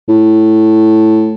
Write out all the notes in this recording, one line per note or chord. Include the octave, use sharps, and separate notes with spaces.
A2